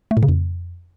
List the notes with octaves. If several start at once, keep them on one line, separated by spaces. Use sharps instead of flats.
A3
A2
C#3
F2